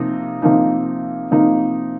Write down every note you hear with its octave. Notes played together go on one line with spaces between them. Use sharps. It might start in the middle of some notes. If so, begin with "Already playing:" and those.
Already playing: C3 F3 A#3 D#4
C3 F3 A#3 D#4
C3 F3 A#3 D#4